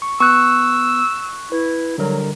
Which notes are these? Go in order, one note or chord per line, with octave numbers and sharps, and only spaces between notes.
C#6
B3 C#6 E6 F#6
E4 B4
D3 F#3 G3 A#4